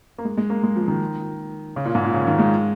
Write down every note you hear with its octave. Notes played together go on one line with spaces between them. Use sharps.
A#3
G#3
G#3
A#3
G#3
F3
D#3
C#3
A#2
G#2
A#2
C#3
D#3
G#3